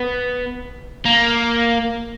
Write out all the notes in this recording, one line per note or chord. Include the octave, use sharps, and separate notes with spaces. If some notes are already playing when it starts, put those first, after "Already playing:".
Already playing: B3
A#3